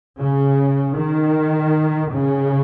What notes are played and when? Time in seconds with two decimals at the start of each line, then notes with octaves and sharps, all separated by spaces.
0.19 C#3
0.97 D#3
2.13 C#3